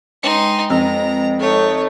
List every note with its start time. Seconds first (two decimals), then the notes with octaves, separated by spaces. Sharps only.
0.23 G#3 D#4 B4 G5 C6
0.70 F2 A#5
1.40 A3 D#4 C#5